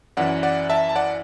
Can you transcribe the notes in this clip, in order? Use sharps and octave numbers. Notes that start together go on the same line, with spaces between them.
F#2 E3 D5 F#5
D5 F#5
E5 A5
A5
D5 F#5